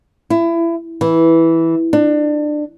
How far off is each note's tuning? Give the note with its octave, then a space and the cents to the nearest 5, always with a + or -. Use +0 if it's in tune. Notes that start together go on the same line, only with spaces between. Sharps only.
E4 +25
E3 -5
D4 +25